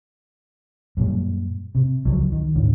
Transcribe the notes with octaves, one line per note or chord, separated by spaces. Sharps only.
F#2 A#2 G3
C3
C#2 F3 F#3
D#3
D#2 A2 D3